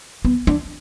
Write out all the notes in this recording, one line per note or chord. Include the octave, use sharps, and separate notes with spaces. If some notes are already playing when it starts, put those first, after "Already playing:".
B3
D4